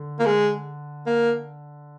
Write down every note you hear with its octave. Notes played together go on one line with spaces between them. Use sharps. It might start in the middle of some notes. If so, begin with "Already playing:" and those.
Already playing: D3
A#3
G#3
A#3